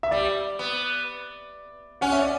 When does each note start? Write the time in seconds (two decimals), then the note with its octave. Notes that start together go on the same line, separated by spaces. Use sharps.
0.03 E5
0.11 G3 D5
0.59 B3
2.01 C#4 F#5
2.12 E5
2.22 D5